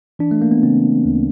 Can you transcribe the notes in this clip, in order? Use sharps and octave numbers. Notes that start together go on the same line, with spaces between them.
E3 D4
A3
A#3
B3
C#3 C4
D2